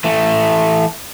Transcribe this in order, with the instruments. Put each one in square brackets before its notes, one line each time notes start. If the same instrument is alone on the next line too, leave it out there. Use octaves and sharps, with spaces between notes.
[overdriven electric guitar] E3 A3